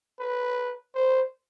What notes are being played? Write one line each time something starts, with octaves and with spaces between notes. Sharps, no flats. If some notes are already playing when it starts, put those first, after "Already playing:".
B4
C5